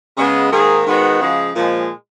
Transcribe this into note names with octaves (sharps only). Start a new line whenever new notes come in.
C#3 G#3 B3
G#2 D#3 A#3 G#4
G#2 D#3 G#3 B3 D#4 F#4
C#3 F3 G#3
A#2 F3 G#3